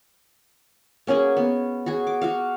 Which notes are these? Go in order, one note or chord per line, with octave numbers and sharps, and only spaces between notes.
A#3 C#4 F#4 G#4
B3
F#4 G#4
D6
F#4 F5